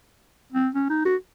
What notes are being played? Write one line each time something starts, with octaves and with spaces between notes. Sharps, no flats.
C4
C#4
D#4
F#4